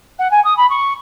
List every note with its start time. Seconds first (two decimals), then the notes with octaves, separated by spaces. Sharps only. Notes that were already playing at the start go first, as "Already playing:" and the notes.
0.18 F#5
0.31 G#5
0.44 D#6
0.57 B5
0.70 C#6